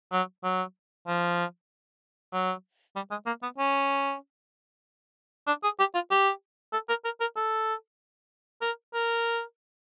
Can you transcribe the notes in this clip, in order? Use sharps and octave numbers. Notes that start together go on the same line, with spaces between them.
F#3
F#3
F3
F#3
G3
G#3
A#3
B3
C#4
D4
G#4
G4
F4
G4
A4
A#4
A#4
A#4
A4
A#4
A#4